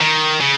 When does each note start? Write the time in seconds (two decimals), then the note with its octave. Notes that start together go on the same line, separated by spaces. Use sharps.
0.01 D#3
0.40 C#3